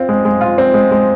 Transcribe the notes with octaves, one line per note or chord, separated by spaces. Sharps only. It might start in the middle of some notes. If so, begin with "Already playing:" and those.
Already playing: C4 F4
G#3
G#3
F4
C4
G#3
G#3